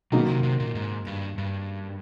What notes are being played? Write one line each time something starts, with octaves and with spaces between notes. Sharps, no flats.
B2 D#3 F#3 A#3 D#4
C3
C3
A#2
G#2
G2
G2